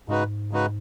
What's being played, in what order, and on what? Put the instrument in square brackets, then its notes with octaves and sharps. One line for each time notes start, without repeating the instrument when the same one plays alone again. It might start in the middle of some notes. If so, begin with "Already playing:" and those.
[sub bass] G#2 [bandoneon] C#3 G#3 D#4 F#4 B4
[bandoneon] C#3 G#3 D#4 F#4 B4